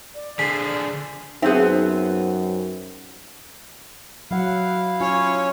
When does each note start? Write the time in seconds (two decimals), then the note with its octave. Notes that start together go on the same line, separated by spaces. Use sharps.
0.15 D5
0.39 D3 F3 G#4 B6 C7
1.42 F#2 B3 C4 D#4 G#4 C5 E5
4.31 F#3 E4 F5 F#5
5.01 C#4 F4 C#5